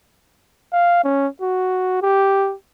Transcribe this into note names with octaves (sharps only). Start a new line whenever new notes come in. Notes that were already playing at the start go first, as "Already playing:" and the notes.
F5
C#4
F#4
G4